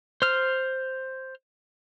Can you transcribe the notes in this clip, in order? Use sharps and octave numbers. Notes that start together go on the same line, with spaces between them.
C5 F6